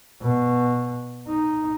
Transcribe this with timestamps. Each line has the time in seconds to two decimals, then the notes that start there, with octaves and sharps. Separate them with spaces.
0.22 B2
1.28 D#4